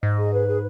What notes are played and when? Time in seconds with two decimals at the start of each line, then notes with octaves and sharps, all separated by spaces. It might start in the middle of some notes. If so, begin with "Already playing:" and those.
0.03 G#2 D#5
0.18 G#4
0.33 B4
0.47 G#4